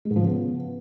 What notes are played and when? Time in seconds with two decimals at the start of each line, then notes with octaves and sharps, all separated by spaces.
0.05 G#3
0.11 G#2
0.16 F3
0.21 C#3
0.27 B3